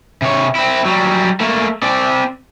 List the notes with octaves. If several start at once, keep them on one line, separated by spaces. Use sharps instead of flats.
C3 C#5
C4 E4
F#3 G3
A3 A#3
C4 D5